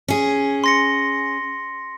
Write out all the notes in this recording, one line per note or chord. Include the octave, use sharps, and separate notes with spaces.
C#4 G#4
C6 A#6 C#7